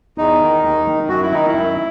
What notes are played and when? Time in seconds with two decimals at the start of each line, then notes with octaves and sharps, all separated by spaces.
0.18 E2 D#4
0.41 D#3
0.64 D#2
0.86 D#3
1.08 F#2 F#4
1.22 E4
1.31 D#3 D#4
1.47 E4
1.54 F#2